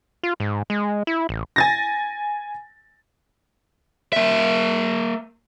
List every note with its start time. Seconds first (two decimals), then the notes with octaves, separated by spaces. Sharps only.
0.23 F4
0.40 G#2
0.70 G#3
1.07 E4
1.29 A1
1.56 G#5 A6 A#6
4.13 A#3 E5